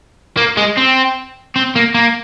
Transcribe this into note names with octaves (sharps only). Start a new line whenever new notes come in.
A#3
G#3
C4
C4
A#3
A#3